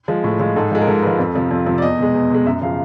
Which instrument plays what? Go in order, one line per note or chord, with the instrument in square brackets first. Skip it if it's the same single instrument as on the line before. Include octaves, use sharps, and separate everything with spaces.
[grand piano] F3 G#3
A2
F3 G#3
G#2 A4
F3 G#3
A#4
G#2 A4
F3 G#3 B4
F2
C3 F3
F2
C3 F3
D5
E2 D#5
B2 G#3
E2
B2 G#3
F#2 E5
C#3 F3 F5